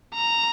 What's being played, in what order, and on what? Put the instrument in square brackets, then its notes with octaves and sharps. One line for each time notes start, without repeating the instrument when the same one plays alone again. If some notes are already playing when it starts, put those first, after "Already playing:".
[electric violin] A#5